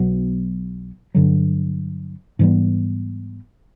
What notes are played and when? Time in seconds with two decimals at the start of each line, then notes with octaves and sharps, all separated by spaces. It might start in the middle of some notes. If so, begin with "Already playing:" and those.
Already playing: B1 B2 F#3
1.15 G2 D3 F#3
2.39 G#2 E3 G3 B3